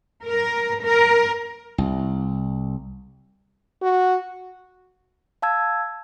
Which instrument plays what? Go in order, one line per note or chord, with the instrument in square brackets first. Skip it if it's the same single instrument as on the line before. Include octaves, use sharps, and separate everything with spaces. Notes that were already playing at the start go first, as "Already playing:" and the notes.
[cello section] A#4
A#4
[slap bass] C2
[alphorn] F#4
[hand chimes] F5 A5 E6 G#6